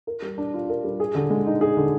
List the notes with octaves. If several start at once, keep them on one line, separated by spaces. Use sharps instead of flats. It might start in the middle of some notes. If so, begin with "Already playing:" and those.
A#4
G3
D4
F4
A#4
G3
G#4
D3
G#3
D#4
G#4
D3